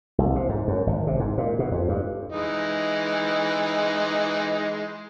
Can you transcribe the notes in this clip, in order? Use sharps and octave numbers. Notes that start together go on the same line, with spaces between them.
C2
C3
G#2
F#2
G#1
C3
G#2
A#2
B2
F2
G2
E3 G#3 D#4